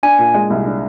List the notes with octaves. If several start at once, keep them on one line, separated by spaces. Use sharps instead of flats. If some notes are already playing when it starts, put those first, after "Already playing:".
D4 G#5
A#2
G#3
C2
D4